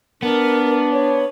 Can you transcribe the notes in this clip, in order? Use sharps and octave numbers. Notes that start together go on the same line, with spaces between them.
B3 D4 A#4
C#5